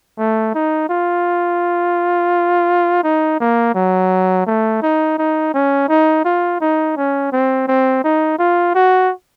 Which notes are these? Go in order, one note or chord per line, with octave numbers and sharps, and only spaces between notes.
A3
D#4
F4
D#4
A#3
F#3
A3
D#4
D#4
C#4
D#4
F4
D#4
C#4
C4
C4
D#4
F4
F#4